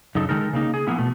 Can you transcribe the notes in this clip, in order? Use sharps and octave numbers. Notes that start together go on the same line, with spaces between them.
F#2 C#3 D#4 A4
D#3 G#3 D#4 A4 A#4
C#3 A#3 D#4
G#4
F3 A#3 B3 E4
B2 A3